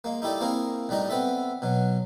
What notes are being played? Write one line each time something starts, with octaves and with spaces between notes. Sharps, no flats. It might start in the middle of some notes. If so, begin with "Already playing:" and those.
G#3 A#3
D#4 E4 G4 A4 D5
A#3 C4 E4 G#4 A#4
A1 G3 D4 D#4 D#5
B3 C4 A4 E5
B2 F#3